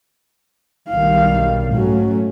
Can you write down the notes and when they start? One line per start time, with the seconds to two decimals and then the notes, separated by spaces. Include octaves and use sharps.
0.90 B1 D#3 G3 F5
1.74 G#2 F#3 A3 C#4